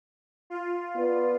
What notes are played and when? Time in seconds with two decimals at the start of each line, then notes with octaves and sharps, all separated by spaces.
0.50 F4
0.94 B3 F4 B4 D5